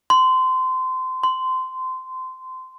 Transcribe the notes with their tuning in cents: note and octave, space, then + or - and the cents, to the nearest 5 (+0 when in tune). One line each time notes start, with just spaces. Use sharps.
C6 -25
C6 -20